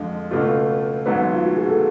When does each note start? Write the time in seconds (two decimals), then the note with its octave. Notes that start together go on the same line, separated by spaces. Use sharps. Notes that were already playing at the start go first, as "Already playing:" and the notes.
Already playing: F2 D3 G#3
0.31 C#2 B2 A3 F4
1.06 G#1 G#2 F#3 B3
1.33 F4
1.45 F#4
1.57 G#4
1.69 A4